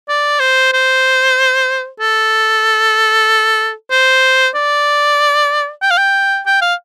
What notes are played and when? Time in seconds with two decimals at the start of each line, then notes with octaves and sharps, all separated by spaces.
0.09 D5
0.40 C5
0.73 C5
2.00 A4
3.91 C5
4.55 D5
5.82 G5
5.91 F5
5.98 G5
6.46 G5
6.62 F5